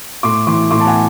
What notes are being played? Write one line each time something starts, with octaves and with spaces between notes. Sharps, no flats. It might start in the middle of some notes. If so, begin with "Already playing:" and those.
A2 C6 D6
E3 C6 D6
A2 C6 D6
A5
F#5 G#5